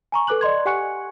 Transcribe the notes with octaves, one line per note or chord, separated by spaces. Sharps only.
G#5 A#5 C#6
A4 B4 D6 F#6 F#7
D5 D#5 C6 G#6
G4 F#5 G#5 C#6 F#6 C#7